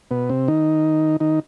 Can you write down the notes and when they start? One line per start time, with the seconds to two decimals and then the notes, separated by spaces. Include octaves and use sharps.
0.11 B2 B3
0.30 C3 C4
0.48 D#3 D#4
1.20 D#3 D#4